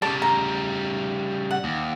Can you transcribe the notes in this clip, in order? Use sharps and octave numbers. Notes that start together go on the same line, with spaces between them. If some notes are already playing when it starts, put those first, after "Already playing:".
C#3 G3 A5 D6
A#5
F#5
D#2